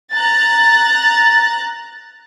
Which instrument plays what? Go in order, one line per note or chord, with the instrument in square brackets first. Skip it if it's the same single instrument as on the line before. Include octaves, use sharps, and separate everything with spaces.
[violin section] A#5 F#6 A6